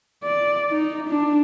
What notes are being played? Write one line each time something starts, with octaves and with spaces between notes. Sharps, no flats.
D5
D#4
D4